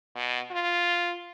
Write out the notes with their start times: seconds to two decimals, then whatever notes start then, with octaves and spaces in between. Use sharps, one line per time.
0.15 B2
0.51 F4